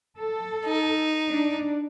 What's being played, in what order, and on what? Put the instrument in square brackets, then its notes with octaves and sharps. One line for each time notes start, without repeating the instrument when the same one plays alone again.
[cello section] A4
[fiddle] D#4
[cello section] D4